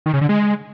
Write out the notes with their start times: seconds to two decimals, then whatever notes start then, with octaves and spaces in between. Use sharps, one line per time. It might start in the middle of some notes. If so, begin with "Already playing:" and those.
0.06 D#3
0.14 C#3
0.21 D3
0.29 G#3